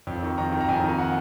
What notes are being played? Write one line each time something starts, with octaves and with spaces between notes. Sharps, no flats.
F2
D#3
F2 A#5
D#3
A#5
F2 G#5
D#3 G#5
F#5